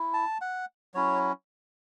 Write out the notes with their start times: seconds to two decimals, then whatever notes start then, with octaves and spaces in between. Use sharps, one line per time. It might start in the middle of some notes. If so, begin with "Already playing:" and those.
Already playing: E4
0.14 A5
0.41 F#5
0.94 F#3 C#4 E4 C#5